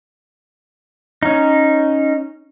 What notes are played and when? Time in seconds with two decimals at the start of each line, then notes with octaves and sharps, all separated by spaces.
1.23 C#4 D#4